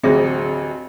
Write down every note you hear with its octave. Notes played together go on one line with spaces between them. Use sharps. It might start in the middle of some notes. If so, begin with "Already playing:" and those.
A1 D2 F#3 C4 G#4 E5